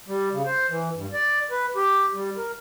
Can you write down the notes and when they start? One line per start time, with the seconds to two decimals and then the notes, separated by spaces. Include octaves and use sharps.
0.08 G3
0.32 C#3
0.46 C5
0.70 E3
0.95 G2
1.13 D5
1.51 B4
1.76 G4
2.14 G3
2.37 A#4